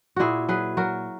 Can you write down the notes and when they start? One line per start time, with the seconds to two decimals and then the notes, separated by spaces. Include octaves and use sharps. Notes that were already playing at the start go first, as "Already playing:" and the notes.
0.16 A#2 E4 F#4 G#4
0.49 F#3 G#4 B4
0.77 F#3 F#4 A#4